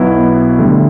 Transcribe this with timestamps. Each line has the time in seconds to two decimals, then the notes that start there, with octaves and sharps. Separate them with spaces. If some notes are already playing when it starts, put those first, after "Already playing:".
Already playing: B1 B2 F#3 B3 E4
0.58 D2 D3 G3